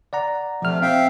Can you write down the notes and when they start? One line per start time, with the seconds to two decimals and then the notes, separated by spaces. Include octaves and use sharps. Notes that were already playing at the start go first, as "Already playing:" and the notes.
0.13 D5 F#5 A#5
0.62 C3 F3 A3 F6
0.82 C4 E5 F5 G5